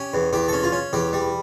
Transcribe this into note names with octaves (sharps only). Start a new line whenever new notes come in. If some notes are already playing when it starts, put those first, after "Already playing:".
Already playing: C#4 G4
E2
E2 G4
C#4 A4
F4
C#4
E2 G4
G3